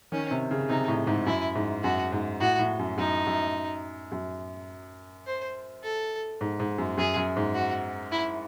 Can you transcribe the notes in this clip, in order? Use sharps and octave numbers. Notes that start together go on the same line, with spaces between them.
D#3 C#4
C3
C#3
C3 D#4
A2
G#2
F#2 E4
G#2
F#2 F#4
G#2
A2 F#4
A2
F#2
F#2 D#4
F#2
F#2
C5
A4
G#2
G#2
F#2
F#2 G#4
F#2
G#2
F#4
E4